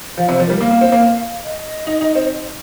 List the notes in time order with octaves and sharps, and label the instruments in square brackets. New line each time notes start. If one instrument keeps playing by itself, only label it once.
[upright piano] F3 [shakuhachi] F5
[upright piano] C3 [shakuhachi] C5
[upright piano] F3
[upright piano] G3 [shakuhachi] A#4
[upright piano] A#3 [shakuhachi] F5
[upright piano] A#3
C4
A#3
[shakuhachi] D#5
[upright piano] D#4
D#4
C4